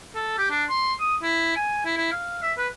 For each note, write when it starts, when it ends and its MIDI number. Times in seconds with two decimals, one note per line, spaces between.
0.15 0.34 69
0.38 0.47 67
0.50 0.64 62
0.69 0.94 84
1.00 1.16 87
1.23 1.56 64
1.56 1.85 80
1.85 1.95 64
1.97 2.11 64
2.12 2.39 77
2.43 2.53 76
2.58 2.68 71